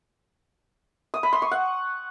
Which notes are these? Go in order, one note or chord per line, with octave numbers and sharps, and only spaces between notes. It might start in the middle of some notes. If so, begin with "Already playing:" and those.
D#6
B5
C6
C#6
F#5